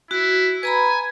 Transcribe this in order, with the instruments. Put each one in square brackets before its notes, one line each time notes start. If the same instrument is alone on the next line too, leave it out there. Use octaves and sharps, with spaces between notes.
[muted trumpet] E4 [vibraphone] F#4
[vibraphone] B4 A#5 B5 [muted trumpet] G#5